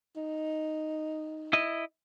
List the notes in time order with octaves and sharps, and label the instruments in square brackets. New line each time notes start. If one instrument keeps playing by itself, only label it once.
[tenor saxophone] D#4
[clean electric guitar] E4 D#5